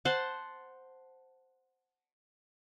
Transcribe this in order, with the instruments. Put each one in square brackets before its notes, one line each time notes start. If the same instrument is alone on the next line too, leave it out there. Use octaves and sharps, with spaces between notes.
[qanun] C5 F#5 A5